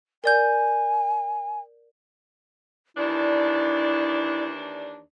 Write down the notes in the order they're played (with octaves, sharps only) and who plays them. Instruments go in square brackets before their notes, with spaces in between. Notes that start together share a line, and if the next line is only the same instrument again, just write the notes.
[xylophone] A#4 D5 G6 [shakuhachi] G#5
[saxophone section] D#2 E3 D4 [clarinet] E4 [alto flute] D5